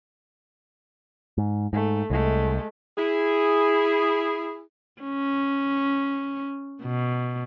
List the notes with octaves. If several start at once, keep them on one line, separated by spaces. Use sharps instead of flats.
G#2
G#2 A3
C2 G#3 A3
E4 G#4
C#4
B2